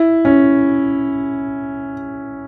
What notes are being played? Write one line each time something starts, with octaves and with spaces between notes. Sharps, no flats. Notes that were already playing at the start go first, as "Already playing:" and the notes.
Already playing: E4
C#4